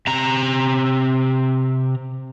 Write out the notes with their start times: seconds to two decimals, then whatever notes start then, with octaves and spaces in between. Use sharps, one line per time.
0.07 C3 A#5